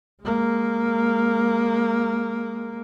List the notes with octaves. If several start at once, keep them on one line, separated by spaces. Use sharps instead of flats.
G#3 A#3